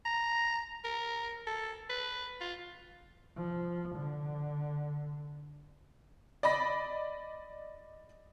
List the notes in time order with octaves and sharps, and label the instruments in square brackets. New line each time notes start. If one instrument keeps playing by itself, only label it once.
[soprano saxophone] A#5
A#4
A4
B4
F4
[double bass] F3
D3
[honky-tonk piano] D5 D#5 B5 A#6